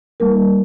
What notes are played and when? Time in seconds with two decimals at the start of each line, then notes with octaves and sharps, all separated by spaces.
0.20 G3 A#3 D#4 A#4